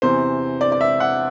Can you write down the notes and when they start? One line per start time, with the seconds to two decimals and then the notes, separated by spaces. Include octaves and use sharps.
0.02 E2 C3 E3 C5
0.61 D5
0.72 D5
0.81 E5
1.00 F#5